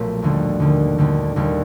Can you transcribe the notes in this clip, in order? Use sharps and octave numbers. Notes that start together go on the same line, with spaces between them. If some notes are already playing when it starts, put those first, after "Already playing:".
Already playing: B1 A#2 F3 A3
D#2 D3 G3
D#2 D3 G3
D#2 D3 G3
D#2 D3 G3